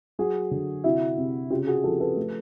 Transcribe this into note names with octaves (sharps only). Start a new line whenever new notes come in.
F#3 F#4 G#4
D3
C3 E4 F#4
C3
C#3 F4 G4
F#4 G#4
F3 G4 A4
A4 B4
A3